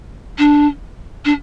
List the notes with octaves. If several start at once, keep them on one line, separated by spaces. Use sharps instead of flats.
D4
D4